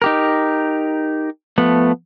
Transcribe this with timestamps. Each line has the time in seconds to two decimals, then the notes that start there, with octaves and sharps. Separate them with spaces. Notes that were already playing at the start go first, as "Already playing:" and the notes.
0.02 D#4 G4 A#4
1.58 F3 A3 B3